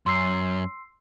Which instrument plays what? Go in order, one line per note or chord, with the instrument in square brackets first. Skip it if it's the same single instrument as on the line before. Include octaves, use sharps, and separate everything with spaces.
[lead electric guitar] F#2 [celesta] C6 E6 C7